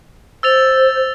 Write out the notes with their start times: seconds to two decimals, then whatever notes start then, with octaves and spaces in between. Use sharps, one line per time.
0.43 C5 E6 A6 F7